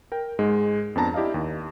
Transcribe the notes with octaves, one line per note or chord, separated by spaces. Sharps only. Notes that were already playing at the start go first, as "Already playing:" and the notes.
A#4 G5
G#2 G#3
F2 B3 D4 A5 A#5
E4 G4 D5 D#5 F5
D#2